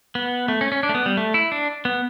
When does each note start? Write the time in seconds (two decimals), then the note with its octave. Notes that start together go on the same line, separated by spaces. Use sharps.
0.15 B3
0.48 A3
0.61 C#4
0.72 C#4
0.83 D4
0.89 A3
0.95 B3
1.06 G3
1.17 A3
1.34 E4
1.52 D4
1.85 B3